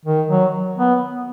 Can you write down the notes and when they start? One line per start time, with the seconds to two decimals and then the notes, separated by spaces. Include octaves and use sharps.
0.05 D#3
0.29 F#3
0.78 B3